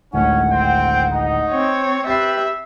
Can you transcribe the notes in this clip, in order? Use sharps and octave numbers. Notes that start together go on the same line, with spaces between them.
D1 G#1 D2 C#4 F#5
C4 C5 G5
D#4
C4 C#5
G4 B4 E5 G5 A6 C7